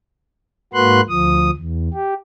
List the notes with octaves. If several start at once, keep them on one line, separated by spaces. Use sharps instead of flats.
G#2 A#3 F#4 B4 C6 F#6
D2 F3 D#6
E2
G4